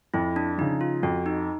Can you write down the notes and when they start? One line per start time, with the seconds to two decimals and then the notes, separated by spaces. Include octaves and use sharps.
0.14 F2 E4
0.36 D4
0.58 C#3 F3 D#4
0.81 F4
1.03 F2 F#4
1.26 D#4